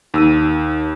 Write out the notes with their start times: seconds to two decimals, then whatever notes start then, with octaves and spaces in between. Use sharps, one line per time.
0.14 D#2 D#4 E6 D#7